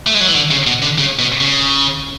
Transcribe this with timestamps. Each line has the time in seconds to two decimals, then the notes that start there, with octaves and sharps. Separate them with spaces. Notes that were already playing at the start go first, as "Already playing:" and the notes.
0.07 A3
0.14 G#3
0.21 F#3
0.28 E3
0.35 D3
0.51 C#3
0.67 B2
0.82 D3
0.98 C#3
1.19 B2
1.41 C#3